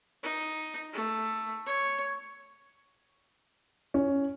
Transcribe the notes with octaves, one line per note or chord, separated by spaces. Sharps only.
D#4
A3
C#5
C#4